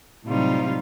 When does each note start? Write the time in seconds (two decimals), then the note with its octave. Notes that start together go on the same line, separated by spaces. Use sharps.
0.25 A2 C3 F#3 G3 D#4 F4